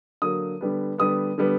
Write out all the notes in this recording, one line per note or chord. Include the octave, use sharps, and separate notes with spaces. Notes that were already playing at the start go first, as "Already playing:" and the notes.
D3 F#3 A#3 D#6
D3 G3 B3
D3 G3 B3 D#6
D3 G3 B3